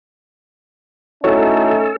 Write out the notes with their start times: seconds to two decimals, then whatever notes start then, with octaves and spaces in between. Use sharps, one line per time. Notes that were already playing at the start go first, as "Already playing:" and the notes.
1.24 A3 C#4 D#4 E4 F#4 A4 C#5